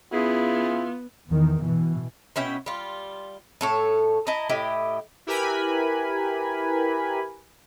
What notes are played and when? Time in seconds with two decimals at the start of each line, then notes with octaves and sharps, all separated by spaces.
0.12 C#3 B3 E4 F4 G#4
1.30 E2 D#3
1.63 B2 E3
2.36 B2 C#4 E4 G5
2.66 G3 F4
3.61 A2 A4 C#5
4.27 E4 D#5 A5 A#5
4.49 A2 E4 G4 D#5
5.27 E4 G4 A#4 B4 G#5 B5